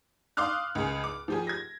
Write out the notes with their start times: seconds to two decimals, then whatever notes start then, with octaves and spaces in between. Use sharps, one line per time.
0.37 F5 C6 D6 D#6 F6 F#6
0.75 C#2 G#4
1.04 D6
1.28 F3 G4 G#4
1.47 G#6 A#6